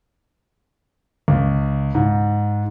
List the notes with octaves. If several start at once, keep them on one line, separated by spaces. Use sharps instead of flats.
C#2
G#2